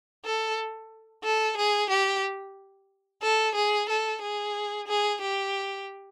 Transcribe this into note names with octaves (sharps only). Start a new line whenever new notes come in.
A4
A4
G#4
G4
A4
G#4
A4
G#4
G#4
G4